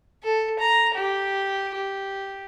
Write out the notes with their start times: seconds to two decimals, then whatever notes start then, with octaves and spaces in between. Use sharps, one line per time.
0.23 A4
0.59 A#5
0.95 G4
1.75 G4